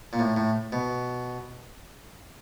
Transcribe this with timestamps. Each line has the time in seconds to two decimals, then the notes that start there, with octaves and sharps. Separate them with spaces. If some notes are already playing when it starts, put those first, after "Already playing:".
0.13 A#2
0.19 A2
0.37 A2
0.72 B2